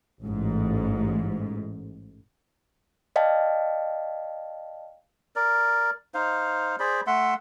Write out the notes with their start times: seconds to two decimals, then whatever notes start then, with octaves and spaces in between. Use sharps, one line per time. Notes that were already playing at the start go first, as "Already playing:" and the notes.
0.25 A1 G#2
3.16 D5 D#5 F5 G5 A5
5.36 A#4 D5
6.14 D#4 C5 F5
6.79 G#4 C5 D5 B5
7.07 A3 E5 F#5 C6